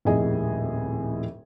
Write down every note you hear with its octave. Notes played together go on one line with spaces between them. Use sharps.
D#1 F2 A2 G#4 D#5 G#5